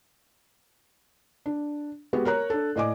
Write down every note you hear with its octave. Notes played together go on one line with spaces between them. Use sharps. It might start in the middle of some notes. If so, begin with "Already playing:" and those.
D4
G#3 B3 F#4 G4
A#4 C#5 A#5 F#6
D4 A4
A2 D5 D#5 G#5 D6